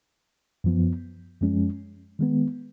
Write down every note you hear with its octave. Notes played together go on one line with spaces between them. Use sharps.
F#2 F3 B3
F#2 F3 G#3 C#4
D#3 G#3 B3